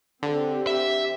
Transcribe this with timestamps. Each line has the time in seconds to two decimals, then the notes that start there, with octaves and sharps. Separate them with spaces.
0.23 D3 C4 G4
0.67 E5